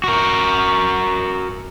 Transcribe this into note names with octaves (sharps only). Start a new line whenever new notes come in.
F#4 A#4